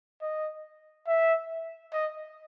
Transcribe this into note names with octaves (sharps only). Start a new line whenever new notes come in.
D#5
E5
D#5